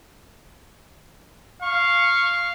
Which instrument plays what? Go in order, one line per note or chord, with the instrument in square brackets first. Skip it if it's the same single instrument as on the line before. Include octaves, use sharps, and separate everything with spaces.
[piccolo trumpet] F5 [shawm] C#6